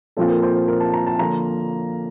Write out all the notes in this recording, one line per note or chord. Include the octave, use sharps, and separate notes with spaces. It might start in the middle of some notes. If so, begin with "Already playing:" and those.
A#2 F3 C4 F4 A4
A#4
C5
C5
A#4
A5
A#5
A5
D3 F3 A#3 F4 A#5